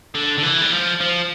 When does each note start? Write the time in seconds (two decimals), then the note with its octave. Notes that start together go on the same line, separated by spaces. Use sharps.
0.15 D3
0.38 D3
0.43 E3
0.62 G3
0.72 F3
1.01 F3